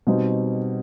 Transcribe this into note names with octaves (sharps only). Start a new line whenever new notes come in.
B2 G3 C4 D#4